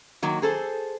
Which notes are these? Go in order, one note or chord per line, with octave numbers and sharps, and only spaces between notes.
D#3 F#3 A#3
G#4 A4 C5